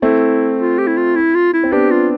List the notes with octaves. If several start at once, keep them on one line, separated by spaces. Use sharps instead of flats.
A3 C4 E4
F4
G4
E4
F4
E4
F4
E4
C4
B3 D4 G4
F4